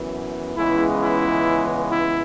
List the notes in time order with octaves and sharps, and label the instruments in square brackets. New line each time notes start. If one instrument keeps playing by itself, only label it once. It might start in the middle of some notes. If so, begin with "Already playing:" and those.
Already playing: [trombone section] F#2 E3 B3
C#2 C#3 E3 G#3 B3 E4
E4
E4